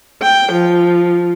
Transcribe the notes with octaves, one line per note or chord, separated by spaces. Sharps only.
G5
F3